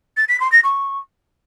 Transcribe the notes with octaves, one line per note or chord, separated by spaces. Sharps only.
A6
B6
C6
A#6
C#6